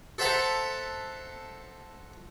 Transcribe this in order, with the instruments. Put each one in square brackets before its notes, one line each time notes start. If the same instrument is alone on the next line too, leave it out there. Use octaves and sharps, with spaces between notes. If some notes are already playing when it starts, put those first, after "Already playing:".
[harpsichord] A4 C5 E5 F#5 A5 A#5